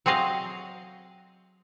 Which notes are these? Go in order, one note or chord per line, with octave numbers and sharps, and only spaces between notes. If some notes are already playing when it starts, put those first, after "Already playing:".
F#3 C4 G#4 D#5 F5